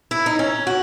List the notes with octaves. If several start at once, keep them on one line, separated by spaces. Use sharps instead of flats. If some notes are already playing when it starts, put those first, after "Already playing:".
E4
D#4
C#4
F#4